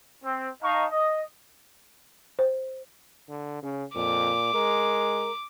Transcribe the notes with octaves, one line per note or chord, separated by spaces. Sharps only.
C4
D#4 D#5 F5 A5 A#5 C#6
D#5
C5
D3
C#3 C#4
F2 A#2 D6
G#3 A#4